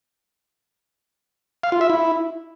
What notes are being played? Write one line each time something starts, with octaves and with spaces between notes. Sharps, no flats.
F5
F4
E5
E4